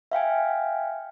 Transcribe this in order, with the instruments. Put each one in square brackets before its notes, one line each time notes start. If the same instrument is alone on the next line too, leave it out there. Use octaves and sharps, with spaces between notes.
[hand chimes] E5 F5 G5 G#5